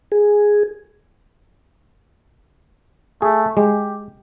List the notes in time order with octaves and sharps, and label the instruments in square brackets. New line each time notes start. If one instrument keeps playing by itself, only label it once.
[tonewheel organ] G#4
[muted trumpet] A3 [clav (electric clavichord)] G#4
[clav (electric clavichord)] G#3 [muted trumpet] G4